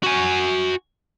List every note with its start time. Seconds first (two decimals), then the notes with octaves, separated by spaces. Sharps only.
0.04 F#4 G#5